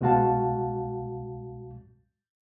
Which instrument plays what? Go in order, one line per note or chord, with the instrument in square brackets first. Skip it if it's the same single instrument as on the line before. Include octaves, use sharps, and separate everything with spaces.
[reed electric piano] C2 B2 G#3 F#4 F5 A5